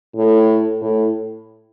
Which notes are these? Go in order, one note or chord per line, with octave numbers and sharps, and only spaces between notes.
A2
A2